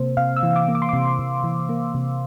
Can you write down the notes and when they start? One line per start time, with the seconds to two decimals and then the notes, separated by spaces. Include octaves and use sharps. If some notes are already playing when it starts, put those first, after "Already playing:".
Already playing: C3 A#3 C5
0.17 C3 F5
0.36 E6
0.43 E3
0.56 D6
0.68 A#3
0.75 D6
0.82 C6
0.89 C3 D6
1.19 C3
1.44 E3
1.69 A#3
1.95 C3